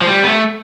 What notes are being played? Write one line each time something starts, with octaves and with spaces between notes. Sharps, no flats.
F3
G3
B3
A3